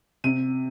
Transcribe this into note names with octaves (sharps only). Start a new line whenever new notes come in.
C3 D#7